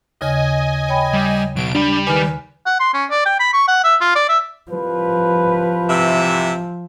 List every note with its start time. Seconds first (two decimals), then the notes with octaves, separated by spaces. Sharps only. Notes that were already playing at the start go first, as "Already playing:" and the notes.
0.21 D#2 C#3 D#5 G#5
0.89 C#5 G5 B5
1.13 G3
1.56 B2 F#3 D7
1.75 G3 D4 B5
2.07 D#3 B4 G#5 F6
2.66 F#5
2.80 C6
2.94 C#4
3.10 D5
3.26 G5
3.39 B5
3.53 C#6
3.68 F#5
3.84 E5
4.01 F4
4.15 D5
4.29 E5
4.71 C2 F3 B4
5.88 C3 E3 E5